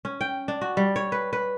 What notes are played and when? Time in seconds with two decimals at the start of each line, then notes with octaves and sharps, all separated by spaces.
0.05 C#4
0.21 G5
0.48 D4
0.61 F#4
0.77 G3
0.96 C#5
1.12 B4
1.33 B4